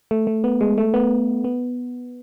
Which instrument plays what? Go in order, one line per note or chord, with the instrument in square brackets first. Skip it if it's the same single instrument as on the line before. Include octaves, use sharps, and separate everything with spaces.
[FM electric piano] A3
A3
B3
G#3
A3
B3
B3